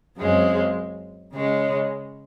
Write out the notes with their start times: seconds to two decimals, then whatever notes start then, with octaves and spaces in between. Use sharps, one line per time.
0.17 F#2 C#3 G#3 C4
1.33 C#3 G#3 C#4